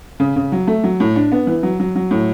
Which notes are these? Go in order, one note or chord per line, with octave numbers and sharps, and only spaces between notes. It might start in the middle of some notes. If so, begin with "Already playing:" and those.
C#3
C#3
F#3
A3
F#3
A2
D4
B3
E3
F#3
F#3
F#3
A2